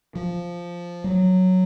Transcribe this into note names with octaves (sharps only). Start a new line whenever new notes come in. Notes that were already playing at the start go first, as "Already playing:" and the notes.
F3
F#3